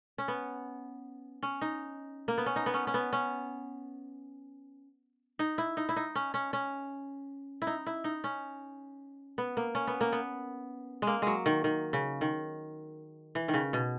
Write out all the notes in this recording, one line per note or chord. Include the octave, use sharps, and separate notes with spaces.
C#4
B3
C#4
D#4
A#3
B3
C#4
D#4
B3
C#4
C#4
B3
C#4
D#4
E4
D#4
E4
D#4
C#4
C#4
C#4
E4
D#4
E4
D#4
C#4
B3
A#3
C#4
B3
A#3
B3
G#3
A#3
F#3 G#3
D#3
D#3
C#3
D#3
E3
D#3
C#3
B2